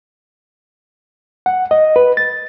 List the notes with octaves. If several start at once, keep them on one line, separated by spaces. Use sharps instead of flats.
F#5
D#5
B4
A6